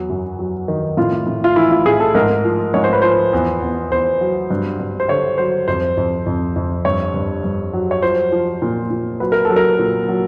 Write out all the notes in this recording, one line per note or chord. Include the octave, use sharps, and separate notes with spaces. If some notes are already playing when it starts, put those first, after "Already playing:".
Already playing: E2 F#3
F#2
F#3
D#3
A2 F4
A2
F4
E3 E4
F4
A2 G#4
A4
G#2 A#4
F3
G#2 C#5
C5
B4
F3 C5
E2
E2
E2 C5
F#3
G2
G2
C5
D3 C#5
F#3 C5
F2 C5
F2
F2
F2
G2 C#5
G2
G2
F#3
C#5
F3 C5
F3
A#2
A#2
F#3 B4
A#4
F#3 A4
A#4
A#2
F#3